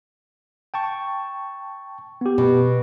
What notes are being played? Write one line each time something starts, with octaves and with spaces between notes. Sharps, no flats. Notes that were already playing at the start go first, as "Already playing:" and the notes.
G5 A5 C#6
B3 G4
B2